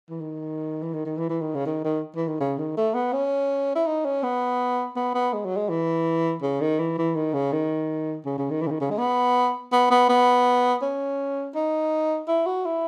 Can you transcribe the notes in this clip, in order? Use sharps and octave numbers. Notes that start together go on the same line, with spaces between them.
E3
D#3
E3
D#3
D#3
E3
E3
D#3
C#3
D#3
D#3
E3
D#3
C#3
D#3
A3
B3
C#4
E4
D#4
C#4
B3
B3
B3
G#3
F#3
G#3
E3
C#3
D#3
E3
E3
D#3
C#3
D#3
C#3
C#3
D#3
E3
C#3
D#3
C#3
G#3
B3
B3
B3
B3
C#4
D#4
E4
F#4
E4